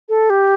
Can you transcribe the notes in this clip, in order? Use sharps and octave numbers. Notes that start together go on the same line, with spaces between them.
A4
G4